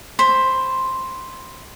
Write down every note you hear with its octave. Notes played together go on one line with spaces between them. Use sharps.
C5 B5